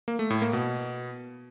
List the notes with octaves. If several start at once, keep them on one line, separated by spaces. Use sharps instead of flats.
A#3
A3
A2
A#3
B2